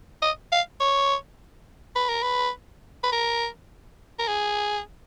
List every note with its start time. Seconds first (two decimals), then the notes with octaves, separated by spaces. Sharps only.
0.22 D#5
0.52 F5
0.80 C#5
1.96 B4
2.09 A#4
2.23 B4
3.03 B4
3.12 A#4
4.19 A#4
4.28 G#4